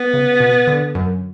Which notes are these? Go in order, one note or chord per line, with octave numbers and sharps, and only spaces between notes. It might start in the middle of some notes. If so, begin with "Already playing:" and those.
Already playing: B3
C#3
B2
D3
F#2